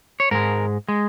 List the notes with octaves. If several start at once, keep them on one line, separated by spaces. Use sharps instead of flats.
C#5
G#2 G#3 A#4
G#3